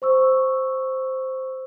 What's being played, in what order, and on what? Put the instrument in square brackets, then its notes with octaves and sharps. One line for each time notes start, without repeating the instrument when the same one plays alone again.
[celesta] C5 C#6 E6